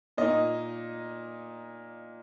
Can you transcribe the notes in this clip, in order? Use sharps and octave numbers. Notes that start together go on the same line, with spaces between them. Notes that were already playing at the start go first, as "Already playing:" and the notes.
A#2 A#3 D#4 D#5